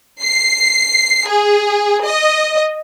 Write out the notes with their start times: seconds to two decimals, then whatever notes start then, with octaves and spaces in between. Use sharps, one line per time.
0.23 C7
1.30 G#4
2.05 D#5